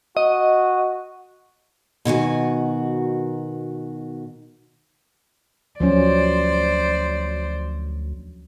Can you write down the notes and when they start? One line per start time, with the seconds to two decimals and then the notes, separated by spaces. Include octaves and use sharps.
0.17 F#4 D#5
2.05 B2 D#3 F#4 G#5
5.80 D2 F3 F#3 C#4 C5 D5